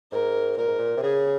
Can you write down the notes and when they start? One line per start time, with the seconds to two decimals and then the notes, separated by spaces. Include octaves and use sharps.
0.12 G#2 A#4
0.57 A#2 A#4
0.67 G#2
0.79 A#2
0.97 C3
1.02 C#3 G#4